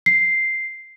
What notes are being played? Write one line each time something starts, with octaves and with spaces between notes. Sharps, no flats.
C7